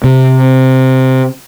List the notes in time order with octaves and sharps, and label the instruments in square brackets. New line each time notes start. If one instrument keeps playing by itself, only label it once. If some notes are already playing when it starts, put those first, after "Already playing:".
[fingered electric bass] C3